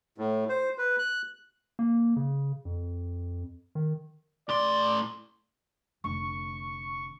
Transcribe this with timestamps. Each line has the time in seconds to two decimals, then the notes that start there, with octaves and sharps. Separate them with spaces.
0.18 A2
0.49 C5
0.78 B4
0.99 F#6
1.79 A#3
2.16 C#3
2.65 F2
3.75 D#3
4.49 A2 D5 C6
6.04 F1 D3 C#6